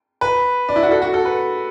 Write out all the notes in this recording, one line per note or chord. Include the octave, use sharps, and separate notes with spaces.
B4
D4
E4
F#4
A4
F#4
A4
B4